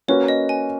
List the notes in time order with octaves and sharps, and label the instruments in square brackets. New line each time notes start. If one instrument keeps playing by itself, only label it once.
[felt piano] A#3 C#4 F#4 B4 [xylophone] C#5
[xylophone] D#5
G#5